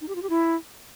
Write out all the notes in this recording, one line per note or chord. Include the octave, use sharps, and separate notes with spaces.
D#4
G4
F4
G4
E4